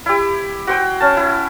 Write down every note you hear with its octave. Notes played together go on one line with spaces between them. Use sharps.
E4 G4
F#4 C5 G5
C#4 A5
E4